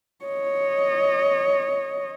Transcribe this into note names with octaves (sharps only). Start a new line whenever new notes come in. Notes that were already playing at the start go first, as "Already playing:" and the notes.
C#5 D#5